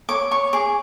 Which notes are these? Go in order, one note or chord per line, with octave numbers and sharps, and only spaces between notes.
C#5 D6
C#5 C#6
G#4 D6